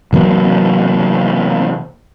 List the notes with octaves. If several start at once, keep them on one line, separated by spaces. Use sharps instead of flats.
C3 E3 F#3 A#3